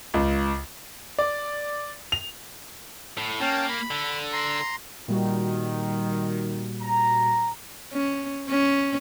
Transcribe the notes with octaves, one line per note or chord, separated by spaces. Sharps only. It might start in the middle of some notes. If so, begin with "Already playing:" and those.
C#2
D5
F7
A2
A#3 C#4 G5 A5
B5
D3
A#5 C6
A#2 D#3 G3 F#4
A#5
C#4
C#4